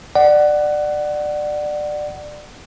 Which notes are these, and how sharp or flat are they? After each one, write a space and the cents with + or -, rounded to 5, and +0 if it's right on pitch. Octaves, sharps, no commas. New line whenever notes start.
D5 +20 F#5 +15